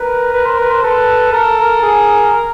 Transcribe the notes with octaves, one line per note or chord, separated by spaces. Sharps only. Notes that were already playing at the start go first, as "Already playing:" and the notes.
Already playing: A#4 B4
B4
C5
B4
C5
A4 B4
A4 A#4
A#4
G#4